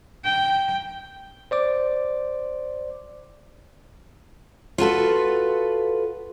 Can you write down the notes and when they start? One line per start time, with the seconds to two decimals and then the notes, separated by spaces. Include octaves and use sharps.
0.25 G5
1.51 C5 D5 D6
4.78 F4 F#4 A4 B4